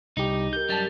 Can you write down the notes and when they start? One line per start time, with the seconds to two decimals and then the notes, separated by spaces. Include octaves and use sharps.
0.17 C2 D#4 G4
0.53 G4 A#4 G6
0.69 F#2 G3 A5 A6